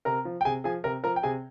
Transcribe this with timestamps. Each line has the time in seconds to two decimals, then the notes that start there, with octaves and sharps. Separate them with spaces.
0.05 C3 A#4 A#5
0.25 F3
0.41 G5
0.45 C3 G#4 G#5
0.64 F3 G#4 G#5
0.84 C3 A#4 A#5
1.04 F3 A#4 A#5
1.16 G5
1.23 C3 G#4 G#5